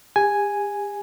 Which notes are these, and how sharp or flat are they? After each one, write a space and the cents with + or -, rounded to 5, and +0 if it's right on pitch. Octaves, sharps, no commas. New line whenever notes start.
G4 +40 G#5 +0